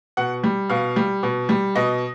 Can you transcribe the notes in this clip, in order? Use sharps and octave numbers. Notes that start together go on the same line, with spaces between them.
B2 F#5
G3
B2 F5
G3
B2
G3
B2 D#5